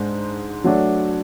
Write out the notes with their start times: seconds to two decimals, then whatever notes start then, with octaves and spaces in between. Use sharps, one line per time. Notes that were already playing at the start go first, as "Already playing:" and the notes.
Already playing: G#2 G#3 D4
0.64 F#3 A3 D4 F#4